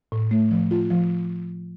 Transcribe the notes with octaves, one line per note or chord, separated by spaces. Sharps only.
A2
A3
F3
F4
F3